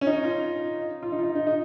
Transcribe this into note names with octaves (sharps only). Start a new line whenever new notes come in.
C#4
D#4
F4
F4
D#4
F4
D#4
D#4
D#4